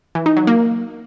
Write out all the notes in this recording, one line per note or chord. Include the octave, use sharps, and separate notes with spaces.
E3
D#4
F#3
A#3